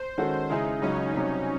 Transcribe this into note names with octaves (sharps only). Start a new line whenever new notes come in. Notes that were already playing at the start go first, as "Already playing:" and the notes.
Already playing: C5
D#3 G#3 C#4 F#4 A4
C#3 G#3 C#4 D#4 E4 G#4
C#2 C#3 F#3 C#4
C2 C3 F#3 C#4